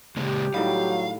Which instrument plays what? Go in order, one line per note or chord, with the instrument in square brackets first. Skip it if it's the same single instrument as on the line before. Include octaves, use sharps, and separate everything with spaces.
[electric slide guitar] C#3 G#3 A#3 [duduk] G4
[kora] A2 D#3 G3 [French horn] F#3 [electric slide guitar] F5